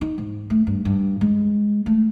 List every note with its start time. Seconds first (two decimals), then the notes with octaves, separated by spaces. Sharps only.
0.01 D#4
0.18 G#2
0.50 A3
0.67 G2
0.85 G2
1.21 G#3
1.86 A3